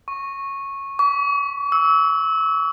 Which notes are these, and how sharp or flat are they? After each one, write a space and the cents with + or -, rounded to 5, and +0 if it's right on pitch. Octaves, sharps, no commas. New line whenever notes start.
C#6 -10
C#6 +45
E6 -25